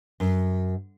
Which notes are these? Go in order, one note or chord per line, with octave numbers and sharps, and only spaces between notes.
F#2